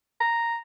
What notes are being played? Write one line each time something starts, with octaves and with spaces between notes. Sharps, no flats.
A#5